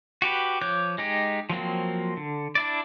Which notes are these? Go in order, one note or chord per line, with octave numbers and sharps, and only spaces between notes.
F#4 G4 B4
F3 C#5 D6 F#6 G6
G#3 D#4 G4
F3 F#3 A#3 C4
D3
D4 E4 D5